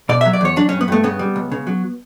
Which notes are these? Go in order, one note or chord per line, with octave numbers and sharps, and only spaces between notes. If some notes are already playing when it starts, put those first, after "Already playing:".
B2 D5
F#3 E5
D5
E2 C#5
F#3 D4
G2 C#4
B3
G2 A3
C#3 B3
G3
C#2
C#3
F#3